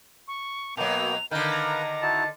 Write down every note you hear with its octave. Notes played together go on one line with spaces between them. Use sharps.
C#6
B2 F#3 A#3 B3 G5 F7
D3 D#3 A#4 B4 F5 G6
A#5
D#4 E4 F#4 A5